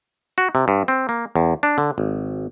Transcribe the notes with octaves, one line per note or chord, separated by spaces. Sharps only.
F#4
C3
G2
C4
A#3
E2
D4
D3
G#1